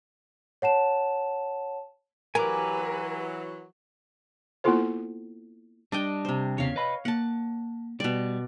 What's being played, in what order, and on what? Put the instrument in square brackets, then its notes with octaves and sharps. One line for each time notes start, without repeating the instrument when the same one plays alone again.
[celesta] C#5 F#5 A5 E7
[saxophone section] E3 F#3 [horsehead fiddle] G4 B4 [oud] A#4 [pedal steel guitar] G#5 A#5 D6
[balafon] A#3 B3 E4 F4 A4 C5
[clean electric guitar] G3 [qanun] D4 D#5 G5
[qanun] C3 C5
[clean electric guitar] E2 C#3 [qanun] C#5 F5
[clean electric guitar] B4 D#5 B5
[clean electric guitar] A#3 [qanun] F#5 A5
[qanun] B2 D5 [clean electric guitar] G3